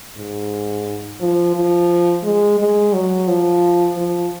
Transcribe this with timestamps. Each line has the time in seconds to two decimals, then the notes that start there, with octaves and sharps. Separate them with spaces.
0.17 G#2
1.21 F3
1.55 F3
2.24 G#3
2.59 G#3
2.93 F#3
3.28 F3
3.97 F3